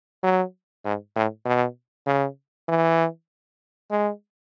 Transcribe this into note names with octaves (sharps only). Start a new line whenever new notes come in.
F#3
G#2
A2
B2
C#3
E3
G#3